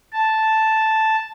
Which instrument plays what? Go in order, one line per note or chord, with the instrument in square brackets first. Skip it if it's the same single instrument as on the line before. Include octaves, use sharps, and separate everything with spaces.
[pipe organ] A5